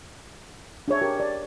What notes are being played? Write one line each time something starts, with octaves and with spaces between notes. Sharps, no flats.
D4 G#4 C#5 E5
G4 A#4
D5